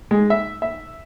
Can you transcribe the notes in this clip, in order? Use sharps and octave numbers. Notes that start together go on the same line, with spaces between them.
G#3
E5
E5